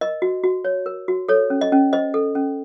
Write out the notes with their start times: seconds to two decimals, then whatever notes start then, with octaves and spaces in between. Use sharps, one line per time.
0.01 A#4 D#5
0.22 F#4
0.44 F#4
0.65 C#5
0.86 A#4
1.08 F#4
1.28 A4 C#5
1.50 C#4
1.61 D#5
1.72 C#4
1.93 C5 D#5
2.14 A4
2.35 C#4